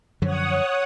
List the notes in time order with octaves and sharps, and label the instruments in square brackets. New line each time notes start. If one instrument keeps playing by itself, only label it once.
[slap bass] F#2 D3 F3 [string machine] C#5 F#5 D#6